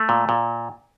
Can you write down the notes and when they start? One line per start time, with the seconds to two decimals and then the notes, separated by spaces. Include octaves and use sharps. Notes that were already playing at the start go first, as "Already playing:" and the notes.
Already playing: A3
0.09 A#2
0.29 A#2